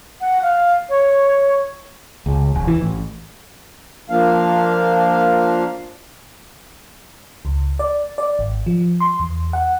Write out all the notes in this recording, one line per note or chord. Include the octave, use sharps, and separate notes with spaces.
F#5
F5
C#5
C#2
E1
E3
A1
F3 A#3 D4 F5
C#2
D5
D5
G#1
F3
C6
E2
F#5